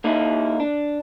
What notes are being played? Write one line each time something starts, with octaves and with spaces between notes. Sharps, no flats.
A#3 D#4 E4
D4